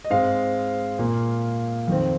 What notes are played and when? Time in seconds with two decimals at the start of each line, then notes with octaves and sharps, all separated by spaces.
0.05 D#5
0.10 G#2 G#3 C4 F5
0.99 A#2 A#3
1.88 F2 D#3 C4